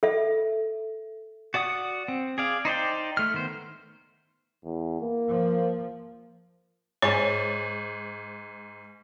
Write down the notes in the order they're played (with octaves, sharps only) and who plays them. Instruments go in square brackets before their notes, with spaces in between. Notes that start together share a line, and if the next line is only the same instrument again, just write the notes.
[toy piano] A4 E5
[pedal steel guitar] F#4 D5 F#5 D#6
C4
G#4 D5 F5
D#4 C5 D5 G5
A3 F6
D#3 B3 C5
[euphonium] E2
A#3
[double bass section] F3
[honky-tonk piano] G#2 [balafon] C#5 G#5